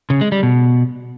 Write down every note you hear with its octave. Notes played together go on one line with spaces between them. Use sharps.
C#3
G#3
G3
B2